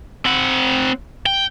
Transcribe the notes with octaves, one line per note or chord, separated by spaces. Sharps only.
C4 F#5
G5